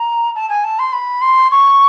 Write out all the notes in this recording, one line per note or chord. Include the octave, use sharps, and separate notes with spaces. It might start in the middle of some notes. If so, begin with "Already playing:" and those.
Already playing: A#5
A5
G#5
A5
C6
B5
C6
C#6